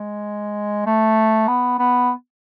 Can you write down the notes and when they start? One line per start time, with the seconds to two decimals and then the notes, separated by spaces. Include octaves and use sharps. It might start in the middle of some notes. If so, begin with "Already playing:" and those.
Already playing: G#3
0.86 A3
1.48 B3
1.79 B3